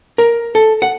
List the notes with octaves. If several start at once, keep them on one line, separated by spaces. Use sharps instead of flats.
A#4
A4
F#5